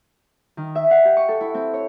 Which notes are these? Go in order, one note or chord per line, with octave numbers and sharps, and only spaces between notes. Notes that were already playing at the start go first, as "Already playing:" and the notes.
D#3
E5
F#5
G4
C#6
A4
E4
C4
C#5